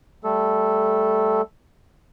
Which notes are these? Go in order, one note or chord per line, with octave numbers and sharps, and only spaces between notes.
G3 A3 A4